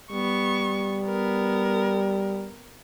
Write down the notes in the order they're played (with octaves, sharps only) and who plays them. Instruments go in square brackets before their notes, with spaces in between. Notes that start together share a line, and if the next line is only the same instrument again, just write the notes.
[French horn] G3 [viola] B3 C#6
[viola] B3 A#4